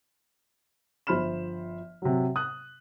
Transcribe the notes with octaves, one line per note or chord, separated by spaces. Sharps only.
G1 F3 C5 B5 F6 E7
C3 F#3
D#6 F#6